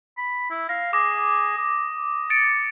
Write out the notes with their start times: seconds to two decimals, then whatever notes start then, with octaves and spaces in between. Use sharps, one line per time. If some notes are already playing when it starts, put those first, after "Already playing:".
0.18 B5
0.50 E4
0.69 F5 A#6
0.93 G#4 D6 A#6
1.58 D#6
2.30 A6 C#7 D7